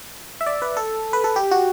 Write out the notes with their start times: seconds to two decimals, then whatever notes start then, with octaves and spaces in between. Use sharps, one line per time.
0.41 E5
0.46 D5
0.62 B4
0.77 A4
1.13 B4
1.24 A4
1.36 G4
1.51 F#4